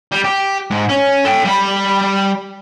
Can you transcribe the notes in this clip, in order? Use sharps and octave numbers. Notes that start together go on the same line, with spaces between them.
G3
G4
G#2
C#4
A4 G5
G3 B5